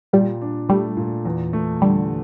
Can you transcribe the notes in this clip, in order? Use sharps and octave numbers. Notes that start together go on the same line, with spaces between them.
A#2 G3
D4
G3 A3
A#2
E2
A3
D3 G3